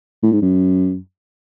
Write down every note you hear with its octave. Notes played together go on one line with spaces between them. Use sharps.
A2
G#2
F#2